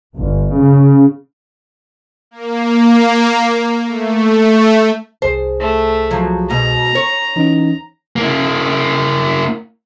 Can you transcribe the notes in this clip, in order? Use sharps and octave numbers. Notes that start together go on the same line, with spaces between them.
G1
C#3
A#3
A3
C2 G#4 C5 A5
A3
F3 F#3
G#2 B2 A#5
C#5
E3 C#4 D#4
A#3 E4